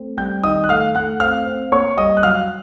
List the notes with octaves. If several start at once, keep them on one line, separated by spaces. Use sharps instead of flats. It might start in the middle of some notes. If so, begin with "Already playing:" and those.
Already playing: A3 C4
G3 G5 G6
D#3 D#5 D#6
F#6
A3 F5 F6
A3 F#5 F#6
C4 F5 F6
C4
A#3 C#5 C#6
G3 D#5 D#6
F#6
F#3 F5 F6